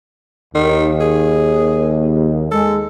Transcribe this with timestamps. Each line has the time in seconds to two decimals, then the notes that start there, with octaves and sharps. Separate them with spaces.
0.55 D#2 D#3
1.01 G#4
2.51 G#3 A4